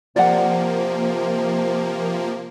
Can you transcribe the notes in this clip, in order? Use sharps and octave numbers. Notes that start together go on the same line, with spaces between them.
C3 F3 A#3 D5 F#5